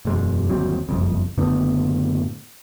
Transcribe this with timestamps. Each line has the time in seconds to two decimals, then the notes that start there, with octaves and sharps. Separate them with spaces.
0.05 E1 F#2 G#3
0.47 G1 D#2 F#3 C4
0.89 F#1 C2 F2
1.38 F#1 A2 D3 B3